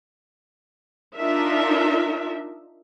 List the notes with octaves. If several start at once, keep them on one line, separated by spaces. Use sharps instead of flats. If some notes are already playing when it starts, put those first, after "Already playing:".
D4 D#4 F4 A#4 E5